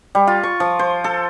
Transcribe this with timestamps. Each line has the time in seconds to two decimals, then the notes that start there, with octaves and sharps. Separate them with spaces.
0.15 G3
0.27 F4
0.43 C#6
0.60 F3
0.79 C5
1.04 A4